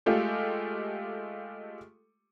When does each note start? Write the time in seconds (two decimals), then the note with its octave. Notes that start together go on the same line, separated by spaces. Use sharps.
0.06 G#3 A3 F4 G4 A4